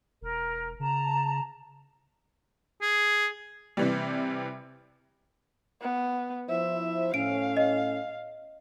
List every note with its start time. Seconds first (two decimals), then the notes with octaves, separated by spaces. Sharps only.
0.21 E1 A#4
0.80 C#3 A5 A#5
2.82 G#4
3.77 C3 E3 G3
5.81 B3
6.49 F3 E4 C5 E5
7.14 A2 C#4 F5 D7
7.57 D#5